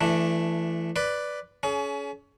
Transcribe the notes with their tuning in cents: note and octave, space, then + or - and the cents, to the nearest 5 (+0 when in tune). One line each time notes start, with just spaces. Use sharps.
E3 +25 A3 +0 D4 +0
B4 +0 D5 +0 C6 -45
C#4 +25 G#4 +40